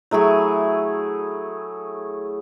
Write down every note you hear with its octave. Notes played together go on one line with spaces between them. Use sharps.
F#3 A3 E4 G#4